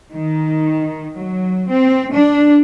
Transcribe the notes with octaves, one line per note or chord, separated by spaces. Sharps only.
D#3
F#3
C4
D4